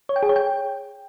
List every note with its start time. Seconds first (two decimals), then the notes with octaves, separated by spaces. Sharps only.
0.09 C#5
0.16 G5
0.23 G#4
0.29 C#5
0.36 G5